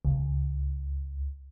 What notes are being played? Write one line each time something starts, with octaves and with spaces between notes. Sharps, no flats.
C#2